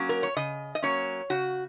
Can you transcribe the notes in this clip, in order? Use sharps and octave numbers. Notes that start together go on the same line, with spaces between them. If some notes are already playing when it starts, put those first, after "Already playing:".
Already playing: F#3 A#3 C#4
A#4
C#5
C#3 D#5
D#5
F#3 A#3 C#4 C#5
C#3 F#4